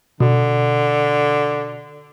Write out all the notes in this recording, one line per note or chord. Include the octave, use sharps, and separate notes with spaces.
B2 D3